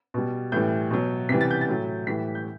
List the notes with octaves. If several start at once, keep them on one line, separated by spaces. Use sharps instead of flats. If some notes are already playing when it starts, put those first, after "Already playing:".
B2 G3
A2 E3 G3 G6
B2 F#3
C3 E3 G3 B6
A6
G6
A6
A2 F#3
A2 E3 G3 B6
G6